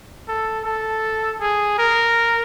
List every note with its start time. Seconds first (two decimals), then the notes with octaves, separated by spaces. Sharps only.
0.29 A4
0.65 A4
1.41 G#4
1.78 A#4